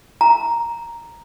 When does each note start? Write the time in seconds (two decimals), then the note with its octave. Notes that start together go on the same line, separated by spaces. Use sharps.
0.21 A#5